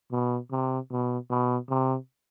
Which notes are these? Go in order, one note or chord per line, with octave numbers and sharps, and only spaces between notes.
B2
C3
B2
B2
C3